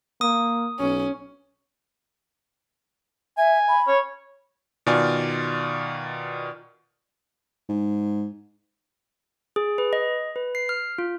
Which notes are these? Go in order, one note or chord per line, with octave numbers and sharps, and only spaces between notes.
A#3 D#6
B1 C#4
E5 G#5
B5
C#5
B2 D#3 F4 D5 G#5 F6
G#2
G#4
B4
D#5
B4
C7
F6
F4